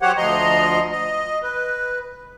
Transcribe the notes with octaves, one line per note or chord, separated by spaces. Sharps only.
F#3 G4 C5 C#5 F#5
D2 F3 D#5 A#5 C6
D#5
B4